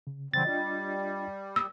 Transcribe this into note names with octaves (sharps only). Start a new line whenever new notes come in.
C#3
C#3 E3 F#3 G3 C4 A6
G3 D4 F4 D#5
D#6 E6